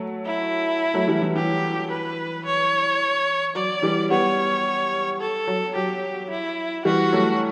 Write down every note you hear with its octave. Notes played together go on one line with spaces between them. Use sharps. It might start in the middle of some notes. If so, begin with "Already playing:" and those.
Already playing: F#3 A3
E4
F#3 A3
E3 G3
E3
E3 G4
B4
C#5
F#3 D5
E3 G3
G3 B3 C#5
A4
F#3
F#3 G4
E4
E3 G3 F#4
F#3 A3